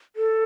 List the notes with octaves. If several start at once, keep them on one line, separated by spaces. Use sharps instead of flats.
A4